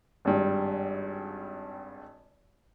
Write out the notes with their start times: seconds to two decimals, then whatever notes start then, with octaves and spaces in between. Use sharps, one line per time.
0.25 G#1 G2